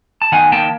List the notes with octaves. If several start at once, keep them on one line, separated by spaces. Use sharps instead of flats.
A5
D#3 F#5 G#5
A#3 G5 A5